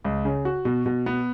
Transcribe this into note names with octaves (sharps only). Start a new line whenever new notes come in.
C#2
C#3
F#4
B2
B2
B3